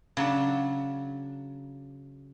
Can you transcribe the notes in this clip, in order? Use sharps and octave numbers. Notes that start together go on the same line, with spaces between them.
C#3 F#3 D4